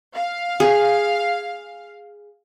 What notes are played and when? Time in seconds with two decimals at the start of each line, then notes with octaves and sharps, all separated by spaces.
0.16 F5
0.60 G#4